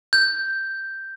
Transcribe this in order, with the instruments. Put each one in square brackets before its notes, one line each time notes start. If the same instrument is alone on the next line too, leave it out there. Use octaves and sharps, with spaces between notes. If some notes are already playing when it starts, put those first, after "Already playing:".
[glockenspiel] G6